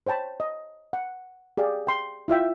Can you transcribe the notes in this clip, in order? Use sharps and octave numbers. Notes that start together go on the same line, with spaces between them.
C5 C#5 G5 A5 B5
D#5
F#5
G4 G#4 D5 F5
G5 C6
E4 F4 E5 G5